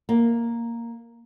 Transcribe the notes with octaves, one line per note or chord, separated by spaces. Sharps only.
A#3